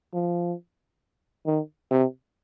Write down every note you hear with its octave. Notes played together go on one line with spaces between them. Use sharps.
F3
D#3
C3